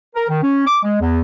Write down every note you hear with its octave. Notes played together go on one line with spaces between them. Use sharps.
A#4
D#3
C#4
D6
G#3
E2